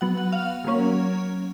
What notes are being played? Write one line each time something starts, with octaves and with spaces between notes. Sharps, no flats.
F#3 B3 F#5
F#5
F5
F#3 A#3 C#4